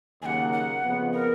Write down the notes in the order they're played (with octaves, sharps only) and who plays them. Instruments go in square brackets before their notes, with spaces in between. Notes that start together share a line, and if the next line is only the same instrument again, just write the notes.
[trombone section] D#2 C#3 F#3 A#3 [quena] F#5 G#5
[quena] F#5
[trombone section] F2 C#3 F3 B3
[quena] A#4